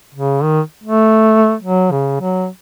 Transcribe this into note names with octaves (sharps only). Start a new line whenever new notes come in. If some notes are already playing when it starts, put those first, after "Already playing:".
C#3
D#3
A3
F#3
C#3
F#3